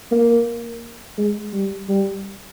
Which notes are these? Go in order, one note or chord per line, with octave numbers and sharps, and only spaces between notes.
A#3
G#3
G3
G3